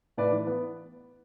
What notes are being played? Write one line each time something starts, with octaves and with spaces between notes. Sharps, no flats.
A2 B4 D5
E3
B3